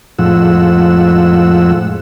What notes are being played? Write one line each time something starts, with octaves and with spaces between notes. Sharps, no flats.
F2 A2 F3 G#3 F#5 E6